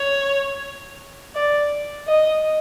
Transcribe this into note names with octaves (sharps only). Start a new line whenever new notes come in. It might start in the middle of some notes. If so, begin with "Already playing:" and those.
Already playing: C#5
D5
D#5